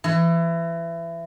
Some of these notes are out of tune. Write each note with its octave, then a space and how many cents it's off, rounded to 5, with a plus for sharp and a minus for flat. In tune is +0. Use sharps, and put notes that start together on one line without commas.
E3 +25